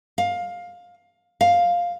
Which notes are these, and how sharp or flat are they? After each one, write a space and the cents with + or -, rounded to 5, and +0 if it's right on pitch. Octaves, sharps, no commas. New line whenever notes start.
F5 +15
F5 +5